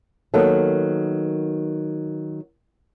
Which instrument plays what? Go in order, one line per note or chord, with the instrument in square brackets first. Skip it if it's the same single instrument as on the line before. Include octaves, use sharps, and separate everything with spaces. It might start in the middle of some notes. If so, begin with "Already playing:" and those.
[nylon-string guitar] D#3 F#3 A#3 B3 A4